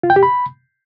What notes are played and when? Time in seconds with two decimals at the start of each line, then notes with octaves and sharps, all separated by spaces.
0.03 F4
0.10 G5
0.16 G4
0.23 B5